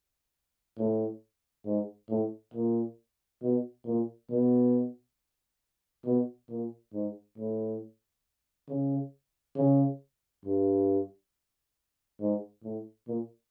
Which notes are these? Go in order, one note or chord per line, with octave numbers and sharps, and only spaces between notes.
A2
G#2
A2
A#2
B2
A#2
B2
B2
A#2
G#2
A2
C#3
C#3
G2
G#2
A2
A#2